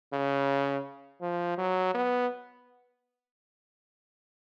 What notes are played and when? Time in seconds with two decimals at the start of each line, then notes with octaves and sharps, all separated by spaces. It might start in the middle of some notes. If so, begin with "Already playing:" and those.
0.13 C#3
1.21 F3
1.58 F#3
1.95 B3